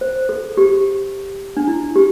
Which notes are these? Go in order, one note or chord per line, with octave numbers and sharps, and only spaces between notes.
C5
A4
G4
D4
E4
G4